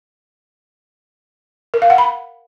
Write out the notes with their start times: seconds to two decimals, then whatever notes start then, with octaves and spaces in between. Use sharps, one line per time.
1.74 A#4
1.82 F5
1.90 F#5
1.98 B5